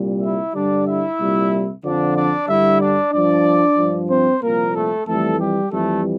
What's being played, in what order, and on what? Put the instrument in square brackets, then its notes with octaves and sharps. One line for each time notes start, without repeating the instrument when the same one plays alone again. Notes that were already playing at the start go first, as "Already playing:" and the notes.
Already playing: [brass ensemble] C2 A#2 G3
E4 E5
G2 D3 G3 D4 D5
E4 E5
C2 A#2 G3
F2 D3 F3 D4 D5
D4 D5
G2 D3 G3 E4 E5
D4 D5
G2 F3 D4 D5
G2 F3
C4 C5
C2 A#2 F3 A#3 A#4
A3 A4
F2 E3 G3 A3 A4
G3 G4
F2 E3 G3 A3 A4